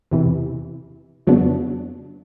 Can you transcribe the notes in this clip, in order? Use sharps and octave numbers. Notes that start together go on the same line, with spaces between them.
E2 C3 E3
F2 C#3 F#3 B3 D4